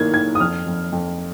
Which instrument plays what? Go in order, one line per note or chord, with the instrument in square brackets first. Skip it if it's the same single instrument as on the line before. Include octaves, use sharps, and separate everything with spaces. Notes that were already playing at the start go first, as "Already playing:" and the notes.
Already playing: [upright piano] D#3 A#3 G#6
D#3 G#6
D#6
F2 F6
F2
F2